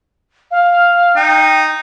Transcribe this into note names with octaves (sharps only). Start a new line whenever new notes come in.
F5
D#4 G5